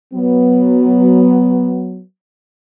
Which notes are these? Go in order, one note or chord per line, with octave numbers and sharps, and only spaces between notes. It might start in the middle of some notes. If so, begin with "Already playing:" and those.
F#3 B3